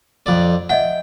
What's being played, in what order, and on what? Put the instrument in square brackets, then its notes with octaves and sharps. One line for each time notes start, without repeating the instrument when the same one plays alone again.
[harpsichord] F2 D5
[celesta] D#5 E5 F#5 [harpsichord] G5